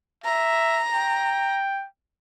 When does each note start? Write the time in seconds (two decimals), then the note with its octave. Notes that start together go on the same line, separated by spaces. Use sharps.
0.24 E5 A#5
0.93 G5